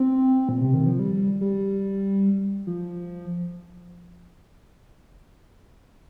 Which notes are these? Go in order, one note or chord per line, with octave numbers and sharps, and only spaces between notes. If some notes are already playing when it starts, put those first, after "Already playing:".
Already playing: C4
A#2
C3
D#3
F3
G3
G3
F3